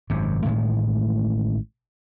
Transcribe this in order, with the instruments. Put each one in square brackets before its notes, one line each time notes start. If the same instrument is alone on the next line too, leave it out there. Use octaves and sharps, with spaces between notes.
[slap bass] G#1 F#2 C3
A1 A2 D#3 G#3